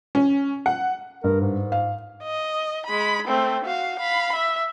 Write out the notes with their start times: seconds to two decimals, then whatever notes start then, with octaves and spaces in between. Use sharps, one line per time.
0.15 C#4
0.66 F#5
1.24 G2 A#4
1.41 G#2
1.72 F5
2.23 D#5
2.86 G#3 B5
3.27 A3 C4
3.65 F#4 F5
3.99 F5 B5
4.35 E5